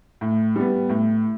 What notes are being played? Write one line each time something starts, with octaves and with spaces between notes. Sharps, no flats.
A2
G3 B3
A2